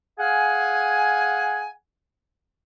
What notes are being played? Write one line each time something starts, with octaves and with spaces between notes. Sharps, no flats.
G#4 F5 F#5 G#5